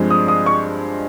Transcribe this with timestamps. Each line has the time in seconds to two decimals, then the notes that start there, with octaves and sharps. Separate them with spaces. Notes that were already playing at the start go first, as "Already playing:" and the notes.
Already playing: G2 F3 G#3 C4
0.10 D#6
0.28 D#6
0.46 C#6